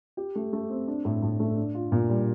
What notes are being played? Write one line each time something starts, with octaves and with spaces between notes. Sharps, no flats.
G4
A3
A3
C4
D4
A2
A2
A3
D4
F4
A#2
G3